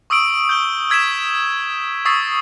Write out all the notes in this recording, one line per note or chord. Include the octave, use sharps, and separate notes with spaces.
C#6 D#6 E6 D7 F#7
G6 G7
E6 G#6 B6 D7 E7
C#6 D#6 E6 A6 B6 C7